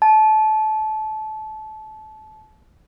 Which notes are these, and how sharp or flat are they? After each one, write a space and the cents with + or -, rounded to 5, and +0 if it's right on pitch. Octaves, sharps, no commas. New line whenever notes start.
A5 -25